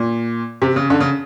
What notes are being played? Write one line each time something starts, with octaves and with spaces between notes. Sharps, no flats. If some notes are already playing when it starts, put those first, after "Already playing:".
Already playing: A#2
C3
C#3
D3
C#3